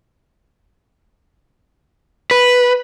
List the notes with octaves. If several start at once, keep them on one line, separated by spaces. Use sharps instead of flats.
B4